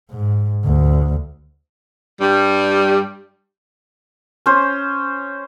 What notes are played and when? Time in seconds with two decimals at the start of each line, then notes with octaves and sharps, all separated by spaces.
0.10 G#2
0.64 D2
2.20 G2 G3
4.46 C#4 C5